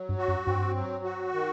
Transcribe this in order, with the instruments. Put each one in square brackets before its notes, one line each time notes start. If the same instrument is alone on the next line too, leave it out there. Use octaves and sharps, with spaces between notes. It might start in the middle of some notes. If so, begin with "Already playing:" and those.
Already playing: [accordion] F#3
[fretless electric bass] G2
[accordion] F#4
[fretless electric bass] F#2
[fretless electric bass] G2 [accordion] C4
[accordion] F#3
F#4
D#3